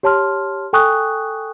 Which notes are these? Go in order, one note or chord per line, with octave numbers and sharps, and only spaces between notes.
G4 C#5 A5 C6 F6
A4 G5 G#5 C#6 D#6 F#6